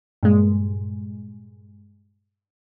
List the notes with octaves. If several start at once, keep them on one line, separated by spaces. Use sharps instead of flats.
G2 A#2 G#3